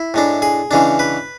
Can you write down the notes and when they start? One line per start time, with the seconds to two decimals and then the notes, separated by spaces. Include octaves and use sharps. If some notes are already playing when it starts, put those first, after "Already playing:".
Already playing: E4
0.14 A2 G#3 D4
0.42 G#4
0.71 C#3 E3 G#3 D4
0.99 B4